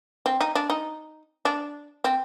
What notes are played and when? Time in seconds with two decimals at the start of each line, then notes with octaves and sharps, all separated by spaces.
0.26 C4
0.41 D#4
0.55 D4
0.70 D#4
1.45 D4
2.04 C4